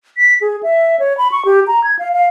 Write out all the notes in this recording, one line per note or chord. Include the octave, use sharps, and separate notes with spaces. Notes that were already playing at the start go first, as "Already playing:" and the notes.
B6
G#4
E5
C#5
B5
C#6
G4
A#5
G#6
F5
F5